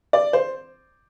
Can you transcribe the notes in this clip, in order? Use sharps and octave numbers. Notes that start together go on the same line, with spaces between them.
D5
C5